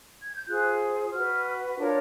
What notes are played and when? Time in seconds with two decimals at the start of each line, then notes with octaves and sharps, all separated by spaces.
0.23 G#6
0.36 G6
0.48 F4 G#4 C5 F#6
1.13 F#4 B4 F6
1.79 D4 F4 A#4 C#5